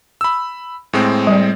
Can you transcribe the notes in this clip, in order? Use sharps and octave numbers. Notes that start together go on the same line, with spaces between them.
B5 E6
A2 G#3 C4
G3 D5